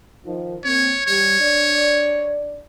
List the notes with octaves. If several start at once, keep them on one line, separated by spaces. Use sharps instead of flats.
D#3 F3
A#3 C4 C#5
G3 C#5
D4 D5